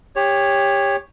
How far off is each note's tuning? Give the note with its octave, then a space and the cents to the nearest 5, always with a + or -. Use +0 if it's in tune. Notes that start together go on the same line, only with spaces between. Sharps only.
G4 +25 C#5 +0